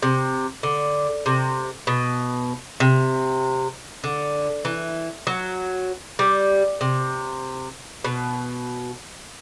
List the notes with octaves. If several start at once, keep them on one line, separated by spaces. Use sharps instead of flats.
C3
D3
C3
B2
C3
D3
E3
F#3
G3
C3
B2